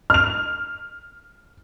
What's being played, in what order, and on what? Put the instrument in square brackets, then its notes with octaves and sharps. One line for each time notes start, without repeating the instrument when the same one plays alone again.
[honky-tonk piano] F6 F7